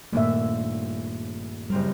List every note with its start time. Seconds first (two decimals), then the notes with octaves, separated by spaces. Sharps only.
0.13 D#1 G2 A#2 A3 A#3 E5
1.70 F#1 G3 C4 A#4